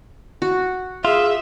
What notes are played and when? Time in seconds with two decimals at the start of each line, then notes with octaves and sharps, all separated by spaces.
0.42 F#4
1.05 F4 G#4 E5